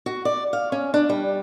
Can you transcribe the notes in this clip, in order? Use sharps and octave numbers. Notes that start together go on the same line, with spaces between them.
F#4
D5
F5
C#4
D4
G3